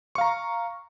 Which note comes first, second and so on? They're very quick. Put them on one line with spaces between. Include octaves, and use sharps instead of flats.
C#6 F5 A#5